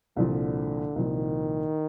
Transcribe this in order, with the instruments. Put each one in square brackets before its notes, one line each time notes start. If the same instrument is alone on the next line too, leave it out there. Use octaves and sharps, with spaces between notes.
[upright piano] C2 A#2 F3 [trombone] D3
[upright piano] C2 A#2 F3 [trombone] D#3